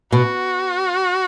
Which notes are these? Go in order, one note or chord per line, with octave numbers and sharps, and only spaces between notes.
B2 F#4